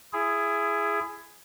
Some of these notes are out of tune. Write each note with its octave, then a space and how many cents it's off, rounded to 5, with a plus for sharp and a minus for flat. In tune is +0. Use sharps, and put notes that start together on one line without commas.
E4 +25 G#4 +0